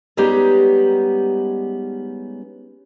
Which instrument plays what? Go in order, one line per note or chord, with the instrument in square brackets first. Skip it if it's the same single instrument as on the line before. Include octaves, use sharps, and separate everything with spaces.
[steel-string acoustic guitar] G3 G#3 B3 C#4 D#4 G4